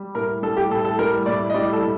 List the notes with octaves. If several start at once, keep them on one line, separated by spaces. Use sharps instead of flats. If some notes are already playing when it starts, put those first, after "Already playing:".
Already playing: G3
A2 A#4
G3 A4
G4
A2 A4
A4
G3 A#4
A2 D5
D#5
G3 D5
A4
A2